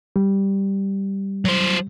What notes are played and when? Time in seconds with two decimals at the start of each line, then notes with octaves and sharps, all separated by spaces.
0.16 G3
1.45 F#3 C5